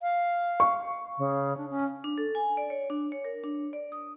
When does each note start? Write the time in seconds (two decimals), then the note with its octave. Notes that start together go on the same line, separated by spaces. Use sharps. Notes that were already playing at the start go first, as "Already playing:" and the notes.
0.02 F5
0.60 C#6
1.18 C#3
1.57 D4
1.70 C#4
2.04 D4
2.18 A4
2.35 G#5
2.57 D5
2.70 C#5
2.90 D4
3.12 C#5
3.25 A#4
3.44 D4
3.73 D5
3.92 D#6